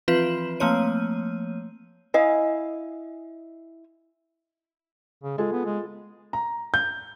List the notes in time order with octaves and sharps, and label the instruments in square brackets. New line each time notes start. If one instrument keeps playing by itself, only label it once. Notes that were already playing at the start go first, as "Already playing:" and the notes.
[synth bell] E3 F3 C4 F4 B4 E7
F3 A3 A#3 C4 C#5 D#7
[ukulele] E4 D#5 F5 G#5
[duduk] C#3
[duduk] G#3 [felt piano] F4 G#4 A4
[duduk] B3
G#3
[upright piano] A#5
G6